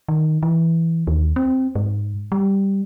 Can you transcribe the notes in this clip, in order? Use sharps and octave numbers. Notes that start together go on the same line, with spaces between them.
D#3
E3
D#2
C4
G#2
G3